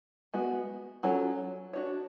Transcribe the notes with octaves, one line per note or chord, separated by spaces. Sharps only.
G#3 B3 F#4
F#3 C#4 F4 A4 C#5
D4 F#4 C#5